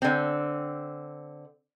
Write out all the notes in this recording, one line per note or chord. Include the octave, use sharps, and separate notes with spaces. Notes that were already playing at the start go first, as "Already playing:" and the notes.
D3 C4